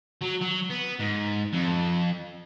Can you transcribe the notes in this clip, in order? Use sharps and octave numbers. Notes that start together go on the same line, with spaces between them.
F#3
F#3
B3
G#2
F2